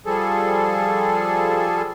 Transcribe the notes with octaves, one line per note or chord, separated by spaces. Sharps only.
F3 G3 G#4 A4